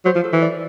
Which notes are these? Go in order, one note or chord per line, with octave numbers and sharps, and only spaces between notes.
F#3 C5
F3
A4
E3
D5